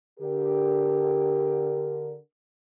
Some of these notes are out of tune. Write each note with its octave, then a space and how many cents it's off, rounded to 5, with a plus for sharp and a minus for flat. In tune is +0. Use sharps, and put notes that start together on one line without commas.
D3 -10 G4 +0 A#4 +0